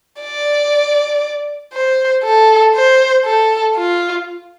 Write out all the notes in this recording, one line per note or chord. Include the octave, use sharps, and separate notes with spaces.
D5
C5
A4
C5
A4
F4